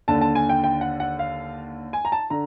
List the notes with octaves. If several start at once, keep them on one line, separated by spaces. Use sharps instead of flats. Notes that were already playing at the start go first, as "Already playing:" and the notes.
D#2 D3 A5
A5
G#5
G5
G5
F#5
F#5
F5
G#5
A#5
A5
D3 A#5